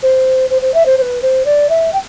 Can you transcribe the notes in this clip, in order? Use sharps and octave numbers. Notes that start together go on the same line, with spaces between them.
C5
C5
C5
E5
C5
C5
B4
C5
D5
E5
G5